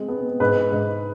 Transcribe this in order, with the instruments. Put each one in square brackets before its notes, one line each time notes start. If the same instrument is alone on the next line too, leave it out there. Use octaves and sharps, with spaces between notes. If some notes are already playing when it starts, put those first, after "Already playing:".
Already playing: [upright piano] G#3 C4
B3
G#2 B4
G#2